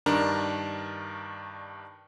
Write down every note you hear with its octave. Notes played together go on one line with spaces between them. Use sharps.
G2 D#3 D4 A#4 A#5